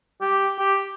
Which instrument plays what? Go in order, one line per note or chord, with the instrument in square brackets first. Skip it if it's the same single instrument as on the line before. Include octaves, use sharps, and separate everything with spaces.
[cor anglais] G4
G4